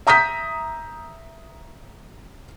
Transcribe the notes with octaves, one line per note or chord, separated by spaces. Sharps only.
E5 A#5 D#6 G6 B6